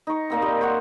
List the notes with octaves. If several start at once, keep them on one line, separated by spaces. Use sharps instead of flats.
D#4 C#6
A#2 A#3 C4
G3 D#5 G5
C5 C#5 F#5 D6